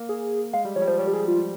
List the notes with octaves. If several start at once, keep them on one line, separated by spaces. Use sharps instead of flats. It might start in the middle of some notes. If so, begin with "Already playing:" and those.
Already playing: A#3
G#4
G#3 F5
G3
F3 C#5
G3
F3 C5
G3 C#5
G4
G#4
F4